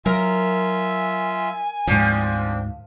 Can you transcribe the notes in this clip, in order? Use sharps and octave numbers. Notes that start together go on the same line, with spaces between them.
F#3 F4 A#4 E5 G#5
D2 G#2 F3 C4 D4